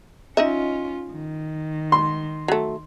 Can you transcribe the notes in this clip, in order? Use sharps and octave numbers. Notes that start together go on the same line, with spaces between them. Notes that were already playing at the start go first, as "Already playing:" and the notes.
C#4 D#4 F4 D#5 E5
D#3
C6
F#3 A3